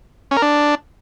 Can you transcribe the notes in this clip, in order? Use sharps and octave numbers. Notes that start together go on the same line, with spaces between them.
C#4
A#4
D4